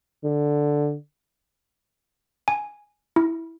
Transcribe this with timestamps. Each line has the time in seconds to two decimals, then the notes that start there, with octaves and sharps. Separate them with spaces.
0.24 D3
2.48 G#5
3.16 E4